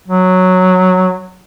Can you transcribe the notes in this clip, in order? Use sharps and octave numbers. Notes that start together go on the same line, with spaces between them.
F#3